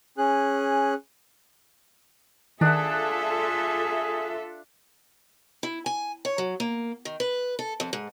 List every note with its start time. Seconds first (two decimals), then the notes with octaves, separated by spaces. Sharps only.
0.18 C#4 G#4 F#6
2.61 D#3 D4 F4 G#4 A4 E5 F#5
5.63 E4
5.86 G#5
6.25 C#5
6.38 F#3
6.60 A#3
7.05 D#3
7.20 B4
7.59 A4
7.80 F2
7.93 G#2